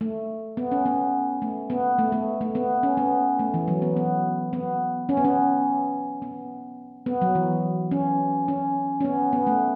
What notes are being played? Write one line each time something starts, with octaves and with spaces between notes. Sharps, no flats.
A3
B3
C#4
B3
A3
B3
A3
A3
A3
B3
C#4
B3
A3
E3
F#3
B3
B3
B3
C#4
B3
C#4
B3
B3
F#3
E3
C#4
C#4
C#4
B3
B3
A3